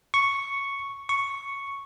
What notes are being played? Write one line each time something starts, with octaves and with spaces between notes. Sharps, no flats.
C#6
C#6